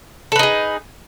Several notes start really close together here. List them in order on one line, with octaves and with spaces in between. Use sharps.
A4 B4 D#4 G#4